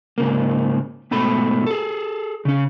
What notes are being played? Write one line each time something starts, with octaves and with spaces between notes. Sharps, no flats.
G#2 C#3 A#3
G#2 B2 A3 B5
G#4 A4
C#3 C#4